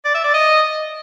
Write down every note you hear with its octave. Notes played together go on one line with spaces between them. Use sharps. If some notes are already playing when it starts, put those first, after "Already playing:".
D5
E5
D5
D#5